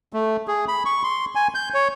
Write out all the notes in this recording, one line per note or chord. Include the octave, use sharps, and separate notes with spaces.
A3
G#4
B5
C#6
C6
G#5
G6
C#5